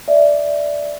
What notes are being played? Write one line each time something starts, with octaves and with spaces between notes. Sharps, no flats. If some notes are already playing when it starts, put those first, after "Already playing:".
D5 E5